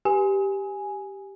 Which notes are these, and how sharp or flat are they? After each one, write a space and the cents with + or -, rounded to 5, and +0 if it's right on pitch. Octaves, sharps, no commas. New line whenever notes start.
G4 +0 G#5 +0